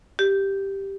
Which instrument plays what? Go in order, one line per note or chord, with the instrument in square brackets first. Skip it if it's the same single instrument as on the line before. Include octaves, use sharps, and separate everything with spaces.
[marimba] G4